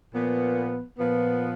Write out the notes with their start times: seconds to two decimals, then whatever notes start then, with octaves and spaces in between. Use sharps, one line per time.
0.14 A#2 F3 B3
0.99 A#2 F3 B3